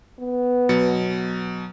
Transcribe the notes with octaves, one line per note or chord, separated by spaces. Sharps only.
B3
B2 F#3 C#7